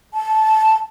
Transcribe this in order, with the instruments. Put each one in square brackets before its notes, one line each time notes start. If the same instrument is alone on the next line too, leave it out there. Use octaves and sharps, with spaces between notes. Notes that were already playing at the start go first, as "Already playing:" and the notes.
[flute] A5